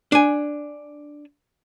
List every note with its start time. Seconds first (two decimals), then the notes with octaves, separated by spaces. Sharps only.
0.12 D4 G#5